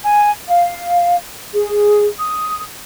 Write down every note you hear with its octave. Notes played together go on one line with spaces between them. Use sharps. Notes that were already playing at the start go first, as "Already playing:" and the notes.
G#5
F5
G#4
D#6